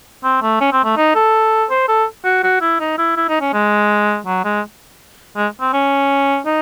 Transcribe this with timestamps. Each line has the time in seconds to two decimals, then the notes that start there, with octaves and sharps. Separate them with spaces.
0.24 C4
0.42 A3
0.61 C#4
0.73 C4
0.85 A3
0.97 D#4
1.15 A4
1.70 C5
1.88 A4
2.25 F#4
2.44 F#4
2.61 E4
2.80 D#4
2.98 E4
3.17 E4
3.29 D#4
3.41 C#4
3.53 G#3
4.27 F#3
4.44 G#3
5.36 G#3
5.61 C4
5.73 C#4
6.46 D#4